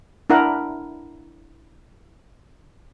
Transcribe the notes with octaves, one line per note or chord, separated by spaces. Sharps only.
D4 E4 A#4 F#5